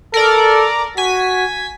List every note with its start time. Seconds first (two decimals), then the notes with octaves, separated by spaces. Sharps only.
0.14 A4 A#4 D5
0.97 F#4 G#5 B6